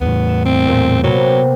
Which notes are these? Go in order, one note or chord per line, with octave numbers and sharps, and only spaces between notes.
E2 A2 B3
E7
C4
A#2 A3
C3 F#3 A#3 B3